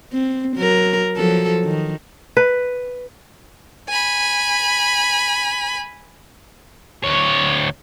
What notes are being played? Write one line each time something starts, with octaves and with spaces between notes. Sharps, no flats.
C4
F#3 A#4
F3 F#3 A4
D#3
B4
G#5 B5
D2 C#5